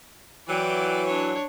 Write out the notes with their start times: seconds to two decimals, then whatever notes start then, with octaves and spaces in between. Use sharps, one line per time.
0.47 E3 F#3 D5 G5
1.06 D4 C#5